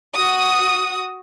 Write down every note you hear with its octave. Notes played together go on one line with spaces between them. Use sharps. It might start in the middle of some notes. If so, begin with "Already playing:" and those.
F#4 D#6